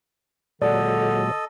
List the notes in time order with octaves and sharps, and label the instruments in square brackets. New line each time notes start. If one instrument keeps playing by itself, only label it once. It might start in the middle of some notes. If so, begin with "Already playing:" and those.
[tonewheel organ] A#2 F#3 G#3 [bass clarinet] D3 [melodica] A4 D#5 [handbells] D5